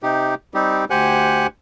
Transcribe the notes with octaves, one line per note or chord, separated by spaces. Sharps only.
C3 D#4 G4
G3 C4 D#4 G4
D2 G4 C5 F#5 G#5 F#6